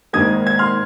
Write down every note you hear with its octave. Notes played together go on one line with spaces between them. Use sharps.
G#1 G#2 D#3 A#3 D#6 G#6
G#6
C6 F6